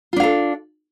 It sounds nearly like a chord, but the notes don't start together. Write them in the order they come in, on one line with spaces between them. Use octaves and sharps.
F4 D4 F5 A4